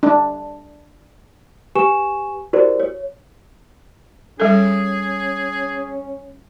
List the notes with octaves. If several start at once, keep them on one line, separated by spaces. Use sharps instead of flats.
D4
G4 B4 G#5 C#6 E7
E4 F#4 G4 A#4 C5 D5
C#5
G3 C#4 G#4 A4